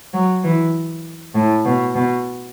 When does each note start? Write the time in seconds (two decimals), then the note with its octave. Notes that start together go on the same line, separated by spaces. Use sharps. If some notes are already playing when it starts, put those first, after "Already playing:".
0.13 F#3
0.43 E3
1.34 A2
1.65 B2
1.95 B2